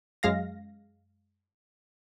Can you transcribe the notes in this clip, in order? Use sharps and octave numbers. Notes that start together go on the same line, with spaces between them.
F#2 G#3 F5 A#6